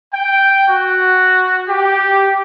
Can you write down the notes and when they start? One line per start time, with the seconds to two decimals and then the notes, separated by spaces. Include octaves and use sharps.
0.14 G5
0.69 F#4
1.69 G4